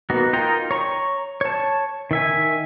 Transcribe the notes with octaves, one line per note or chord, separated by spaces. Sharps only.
A#3 B3 D#4 F#4
D#4 F4 A#4 G5 A#5
C#5 A#5 C#6
C#5 A5
D#3 E5 G#5